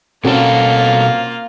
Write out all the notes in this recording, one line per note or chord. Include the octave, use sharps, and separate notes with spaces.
B2 A#3 C4 C#4 F4 F#4 A4